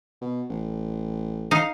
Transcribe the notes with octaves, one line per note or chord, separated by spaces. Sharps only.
B2
A1
D#4 F5